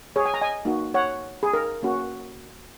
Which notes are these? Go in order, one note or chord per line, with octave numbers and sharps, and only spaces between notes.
G#4 C#5
G#5
A#5
D#5 G#5
A#3 D#4 F#4
C#5 F#5
G#4
A#4
A#3 C#4 F#4